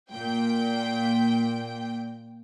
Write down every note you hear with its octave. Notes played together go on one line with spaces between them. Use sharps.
A#2 G5